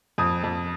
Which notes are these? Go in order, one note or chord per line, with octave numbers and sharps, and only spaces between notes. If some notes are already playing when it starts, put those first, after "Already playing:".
F2 D#6
F2